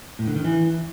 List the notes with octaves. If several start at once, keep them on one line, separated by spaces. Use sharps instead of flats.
A2
D3
D#3
E3